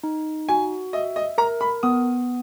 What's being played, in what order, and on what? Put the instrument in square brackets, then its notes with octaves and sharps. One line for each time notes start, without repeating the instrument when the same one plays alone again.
[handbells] D#4
[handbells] F#4 [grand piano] G#5
[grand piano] D#5 [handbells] E5
[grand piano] D#5
[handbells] A#4 [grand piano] A#5
[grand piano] B5
[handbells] B3 [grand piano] D#6